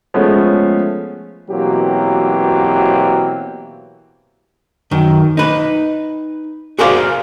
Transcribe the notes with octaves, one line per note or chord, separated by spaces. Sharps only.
F3 G#3 A3 B3 C#4
B2 E3 F#3 A#3 C4 G4
F#2 D#3
D#4 B4
F#4 G#4 A#4 C5 D5 F5